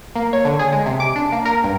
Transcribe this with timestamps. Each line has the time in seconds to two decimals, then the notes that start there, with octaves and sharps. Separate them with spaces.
0.16 A#3
0.33 C#5
0.45 D3
0.59 G#4
0.72 G#3
0.86 C3
1.00 D6
1.16 D4
1.32 A#3
1.45 A#4
1.64 G2